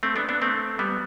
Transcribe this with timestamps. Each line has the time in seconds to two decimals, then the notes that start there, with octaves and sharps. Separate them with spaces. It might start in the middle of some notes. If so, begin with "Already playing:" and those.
0.03 A3 C4
0.16 B3 D4
0.29 B3 D4
0.42 A3 C4
0.79 G3 B3